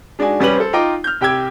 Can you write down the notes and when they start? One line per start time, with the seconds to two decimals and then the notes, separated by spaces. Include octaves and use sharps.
0.19 G#3 D4 D#4 F#4 G#5
0.40 F1 G3 C#4 G4 B4 F#7
0.56 A4 C5
0.73 D#4 F4 D#5 G5 A#5 D6
1.04 F6 G6
1.21 C2 G4 G5 E6 G#6